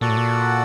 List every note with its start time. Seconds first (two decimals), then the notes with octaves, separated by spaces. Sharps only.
0.01 A#2 F#4 A4 D5 F#5
0.09 A2
0.17 A#2